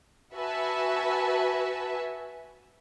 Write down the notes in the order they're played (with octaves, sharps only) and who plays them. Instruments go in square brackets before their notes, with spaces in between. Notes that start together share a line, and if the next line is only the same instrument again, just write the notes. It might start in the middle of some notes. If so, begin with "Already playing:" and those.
[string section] F#4 B4 E5 G#5 A5